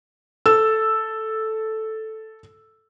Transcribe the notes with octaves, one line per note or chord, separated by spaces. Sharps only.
A4 E6